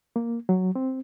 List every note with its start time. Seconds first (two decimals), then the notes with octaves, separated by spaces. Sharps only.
0.16 A#3
0.49 F#3
0.75 C4